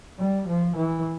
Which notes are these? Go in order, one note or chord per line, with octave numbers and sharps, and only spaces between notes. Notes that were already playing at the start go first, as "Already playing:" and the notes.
G3
F3
E3